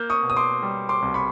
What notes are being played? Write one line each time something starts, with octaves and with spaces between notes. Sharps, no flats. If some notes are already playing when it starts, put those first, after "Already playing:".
Already playing: A#3 F6 G6
C#6 D#6
B2
D#6
C6 D6
G3
C6 D6
C2
B5 C#6